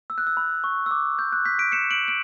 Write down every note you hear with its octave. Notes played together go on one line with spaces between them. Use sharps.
E6
F#6
E6
B5
C#6
E6
D6
G6
F#6
G6 B6
B6 D7
C#7 E7
D7 F#7
D7